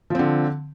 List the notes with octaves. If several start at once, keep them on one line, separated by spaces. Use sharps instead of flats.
D3 F3 C4